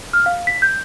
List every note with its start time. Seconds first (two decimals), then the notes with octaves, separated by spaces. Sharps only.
0.13 F6
0.26 F5
0.47 B6
0.62 G6